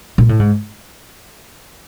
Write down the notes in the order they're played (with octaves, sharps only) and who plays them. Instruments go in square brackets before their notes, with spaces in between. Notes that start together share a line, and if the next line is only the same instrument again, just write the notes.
[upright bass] A#2
A2
G#2